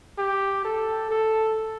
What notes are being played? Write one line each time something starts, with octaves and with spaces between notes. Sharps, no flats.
G4
A4
A4